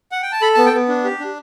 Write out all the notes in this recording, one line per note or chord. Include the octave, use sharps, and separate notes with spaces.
F#5
G5
A5
A4 B5
B3 A5
G5
B3
D4
G4
D4